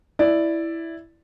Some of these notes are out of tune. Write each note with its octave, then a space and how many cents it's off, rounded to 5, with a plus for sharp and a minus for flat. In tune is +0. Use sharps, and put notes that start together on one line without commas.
E4 +0 D5 +0